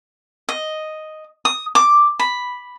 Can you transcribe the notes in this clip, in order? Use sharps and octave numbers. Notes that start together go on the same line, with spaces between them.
D#5
D#6
D6
B5